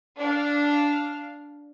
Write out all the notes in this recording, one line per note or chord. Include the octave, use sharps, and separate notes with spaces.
D4 F5